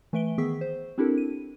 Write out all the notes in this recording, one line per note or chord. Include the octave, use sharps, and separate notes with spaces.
E3 A3 B4 E5 D7 G7
D#3 B3 G#4 C#6 E6 B6
C5
C4 D4 E4 G4 A4 A#4
D#7